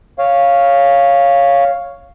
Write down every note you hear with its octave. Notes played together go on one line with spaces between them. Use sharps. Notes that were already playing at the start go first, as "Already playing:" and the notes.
C#5 F5